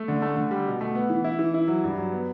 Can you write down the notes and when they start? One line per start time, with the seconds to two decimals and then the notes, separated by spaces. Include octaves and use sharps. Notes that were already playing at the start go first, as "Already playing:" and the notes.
Already playing: A3
0.08 D3
0.22 A3
0.37 D3
0.51 G3
0.67 B2
0.81 A3
0.95 B3
1.10 E3
1.24 E4
1.39 E3
1.54 E4
1.68 F#3
1.84 G2
1.98 F#3
2.12 B3